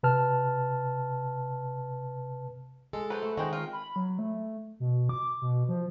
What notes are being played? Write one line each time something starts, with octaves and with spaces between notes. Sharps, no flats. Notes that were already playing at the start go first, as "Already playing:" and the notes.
C3 B4 A5 F6
G#3 A4
F#3 B4 C5
A3
D#3 G#3 C4 D#4 F#4
F4
B5
F#3
A3
B2
D6
B2
F3